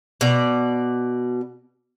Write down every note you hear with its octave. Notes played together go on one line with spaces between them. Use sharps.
B2 D5